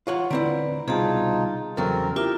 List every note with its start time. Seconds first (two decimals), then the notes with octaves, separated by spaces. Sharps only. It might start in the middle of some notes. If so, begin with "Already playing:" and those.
0.07 F4 C#5 F#5
0.30 D3 C4 E4 B4 D5 A#5
0.88 C2 B2 C4 D#4 F4 G#4 A5
1.77 E2 C#3 F#3 C4 A4 A#4
2.16 E4 F4 G4 A#4 E5